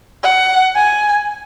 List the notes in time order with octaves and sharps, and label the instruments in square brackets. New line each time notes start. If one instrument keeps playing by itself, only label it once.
[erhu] F#5
G#5